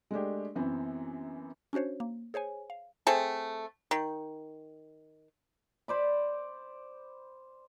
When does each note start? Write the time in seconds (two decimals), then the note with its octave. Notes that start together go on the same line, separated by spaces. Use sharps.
0.11 G#3 A3 D4 G4
0.55 F#2 E3 B3 C4
1.73 C#4 D4 F#4 C5 C#5
2.00 A#3
2.34 G#4 C5 C#5 G#5
2.70 F5
3.07 A3 C4 G#4 A4
3.91 D#3
5.88 C5 D5 B5